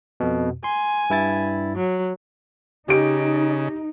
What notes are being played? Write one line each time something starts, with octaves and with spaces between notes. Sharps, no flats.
F2 B2
G#5 C6
G2 E4 A6
F#3
C#3 D#4 G4 D7